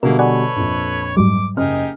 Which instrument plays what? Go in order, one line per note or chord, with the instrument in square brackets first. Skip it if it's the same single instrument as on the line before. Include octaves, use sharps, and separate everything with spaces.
[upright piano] B2 D3 G3 [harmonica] A#3 E4 [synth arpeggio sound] A#4
[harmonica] A4 B4 C#5 [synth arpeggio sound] D5 F#5 G#5
[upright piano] A#1 F2
[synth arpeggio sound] G#2 F#3 G3 [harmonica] D6
[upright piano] F#1 D#5 F6 [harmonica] D#4 G4 G#4